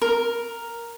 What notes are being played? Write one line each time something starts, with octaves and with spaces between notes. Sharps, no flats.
A#4